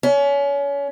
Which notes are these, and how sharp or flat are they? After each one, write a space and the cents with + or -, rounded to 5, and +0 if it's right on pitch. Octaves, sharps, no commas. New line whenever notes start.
C#4 +30